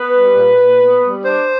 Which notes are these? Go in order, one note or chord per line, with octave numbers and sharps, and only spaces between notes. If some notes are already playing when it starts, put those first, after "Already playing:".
Already playing: B3 B4
G3
A#2
A#2
B3
G3
D4 C5